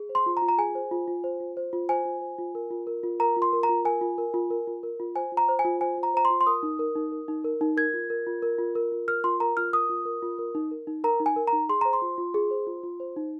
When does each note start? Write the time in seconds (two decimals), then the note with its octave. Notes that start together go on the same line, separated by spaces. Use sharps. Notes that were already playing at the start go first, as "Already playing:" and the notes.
Already playing: G#4
0.09 C5
0.15 C6
0.26 F4
0.37 A#5
0.42 F4
0.48 A#5
0.58 G#4 G#5
0.75 C5
0.91 F4
1.08 F4
1.24 C5
1.40 F4
1.57 C5
1.73 F4
1.89 C5 G#5
2.05 F4
2.21 C5
2.38 F4
2.55 A#4
2.71 F4
2.87 A#4
3.03 F4
3.20 A#4 A#5
3.37 F4
3.42 C6
3.53 A#4
3.63 A#5
3.69 F4
3.85 A#4 G#5
4.01 F4
4.18 A#4
4.34 F4
4.50 A#4
4.67 F4
4.83 A#4
5.00 F4
5.16 C5 G#5
5.32 F4
5.37 A#5
5.49 C5
5.59 G#5
5.65 F4
5.81 C5 G#5
5.98 F4
6.03 A#5
6.14 C5 A#5
6.25 C6
6.30 F4
6.41 C6
6.47 A#4 D#6
6.63 D#4
6.79 A#4
6.95 D#4
7.12 A#4
7.28 D#4
7.44 A#4
7.61 D#4
7.77 A#4 G#6
7.94 F4
8.10 A#4
8.27 F4
8.43 A#4
8.58 F4
8.75 A#4
8.92 F4
9.08 A#4 F6
9.24 F4 C6
9.40 A#4 A#5
9.57 F4 F6
9.73 A#4 D#6
9.90 F4
10.06 A#4
10.23 F4
10.39 A#4
10.55 D#4
10.71 A#4
10.87 D#4
11.04 A#4 A#5
11.20 D#4
11.26 G#5
11.36 A#4
11.47 A#5
11.53 D#4
11.69 G#4 C6
11.81 C5 A#5
11.93 C6
12.02 F4
12.18 F4
12.34 G#4
12.51 C5
12.67 F4
12.83 F4
13.00 C5
13.16 D#4